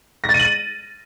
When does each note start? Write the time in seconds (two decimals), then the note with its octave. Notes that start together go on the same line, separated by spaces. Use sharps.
0.24 A#6
0.29 A6
0.34 D#7
0.39 F#7
0.45 D#7